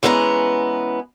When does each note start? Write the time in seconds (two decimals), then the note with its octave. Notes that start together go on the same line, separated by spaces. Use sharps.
0.03 E3 G#3 B3 C#4 D#5 A#5